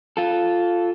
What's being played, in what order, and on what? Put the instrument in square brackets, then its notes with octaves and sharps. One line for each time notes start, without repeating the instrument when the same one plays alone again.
[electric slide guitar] F4 A4